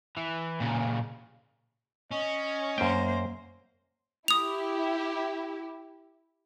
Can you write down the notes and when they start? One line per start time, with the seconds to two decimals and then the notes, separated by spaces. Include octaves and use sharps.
0.17 E3
0.60 A#2 C#3
2.12 C#4 D#5
2.78 F#2 A#3 C5 G5
4.28 E4 G4 D#6 F7